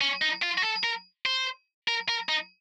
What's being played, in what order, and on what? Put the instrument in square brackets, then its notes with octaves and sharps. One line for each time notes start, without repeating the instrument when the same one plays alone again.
[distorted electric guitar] C#4
D#4
F4
F#4
A4
A#4
C5
A#4
A#4
D#4